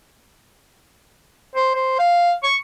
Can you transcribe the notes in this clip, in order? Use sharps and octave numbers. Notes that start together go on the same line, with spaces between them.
C5
C5
F5
C#6